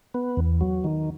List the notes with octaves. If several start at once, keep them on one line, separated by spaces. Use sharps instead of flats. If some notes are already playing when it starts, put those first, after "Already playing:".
B3
E2
F#3
D#3